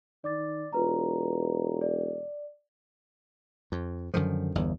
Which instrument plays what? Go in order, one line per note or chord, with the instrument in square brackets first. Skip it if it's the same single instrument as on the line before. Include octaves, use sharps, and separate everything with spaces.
[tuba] D#3 [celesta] D5 D6 A6
[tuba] E1 [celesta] F4 B4 A#5
[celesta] D5
[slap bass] F2
F#2 D3 D#3 F3
G1 E2